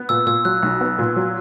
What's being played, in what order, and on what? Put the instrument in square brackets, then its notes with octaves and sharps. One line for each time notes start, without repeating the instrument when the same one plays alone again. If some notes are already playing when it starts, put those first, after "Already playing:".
Already playing: [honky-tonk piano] B3
[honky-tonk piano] A#2 [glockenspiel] E6
[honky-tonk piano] A#2 [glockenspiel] E6
[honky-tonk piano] F#3 [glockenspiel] F#6
[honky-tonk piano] B1
B3
A#2
F#3